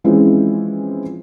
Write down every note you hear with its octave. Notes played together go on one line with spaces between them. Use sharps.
E3 F3 G#3 C4 C#4 E4